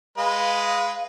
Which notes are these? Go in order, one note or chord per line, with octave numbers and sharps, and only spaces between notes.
G#3 B4 D#5 F5